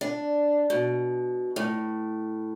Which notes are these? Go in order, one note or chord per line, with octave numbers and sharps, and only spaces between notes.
D4
B2
A2